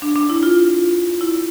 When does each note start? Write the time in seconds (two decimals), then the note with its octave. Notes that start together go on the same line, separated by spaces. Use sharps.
0.02 D4
0.15 D4
0.30 E4
0.43 F4
1.21 E4